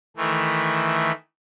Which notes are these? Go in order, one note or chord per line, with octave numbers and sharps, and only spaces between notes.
D#3 E3 A3